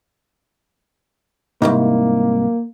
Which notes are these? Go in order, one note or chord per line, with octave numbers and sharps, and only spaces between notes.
C2 F2 G#2 A#3